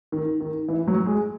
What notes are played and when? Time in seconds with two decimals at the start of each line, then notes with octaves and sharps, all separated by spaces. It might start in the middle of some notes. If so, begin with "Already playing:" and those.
0.12 D#3
0.40 D#3
0.68 E3
0.88 F#3
1.06 G#3